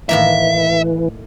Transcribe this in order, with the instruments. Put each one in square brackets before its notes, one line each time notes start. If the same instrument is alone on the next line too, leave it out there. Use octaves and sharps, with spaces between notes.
[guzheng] A2 D#3 A#3 [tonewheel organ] E3 [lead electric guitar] E5